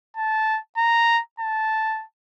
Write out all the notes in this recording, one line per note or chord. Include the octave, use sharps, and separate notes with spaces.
A5
A#5
A5